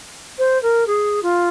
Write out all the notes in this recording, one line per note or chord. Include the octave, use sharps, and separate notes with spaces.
C5
A#4
G#4
F4